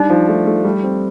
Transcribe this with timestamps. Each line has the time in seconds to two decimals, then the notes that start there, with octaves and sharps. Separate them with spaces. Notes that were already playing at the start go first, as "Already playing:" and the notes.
Already playing: G3 D4 D#4
0.10 F3
0.28 A3
0.46 A3
0.65 G3
0.83 C4